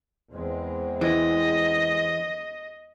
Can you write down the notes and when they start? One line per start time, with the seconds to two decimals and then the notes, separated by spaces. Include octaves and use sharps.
0.31 E2 G#3 C4
1.01 E3 D#5